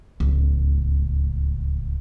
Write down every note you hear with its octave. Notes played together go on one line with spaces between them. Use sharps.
D1 C#2